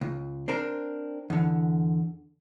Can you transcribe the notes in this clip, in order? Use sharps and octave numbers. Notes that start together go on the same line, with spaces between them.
C#2
C4 D4 A#4
E2 D3